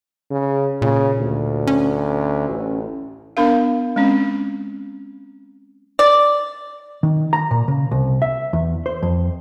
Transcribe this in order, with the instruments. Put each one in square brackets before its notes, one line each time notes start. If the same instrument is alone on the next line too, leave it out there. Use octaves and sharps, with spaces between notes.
[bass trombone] C#3
[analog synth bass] A#2 [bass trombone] C#3
[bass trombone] D2
[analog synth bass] C#4
[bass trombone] A1
[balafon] B3 D4 A#4 F5
G#3 C4 C#4
[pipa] D5
[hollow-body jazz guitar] D#3
A#5
A#2
C#3
C2
E5
E2
C5
F2